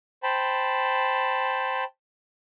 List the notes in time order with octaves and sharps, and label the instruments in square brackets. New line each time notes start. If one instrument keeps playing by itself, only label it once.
[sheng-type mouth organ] C5 G5 A5 B5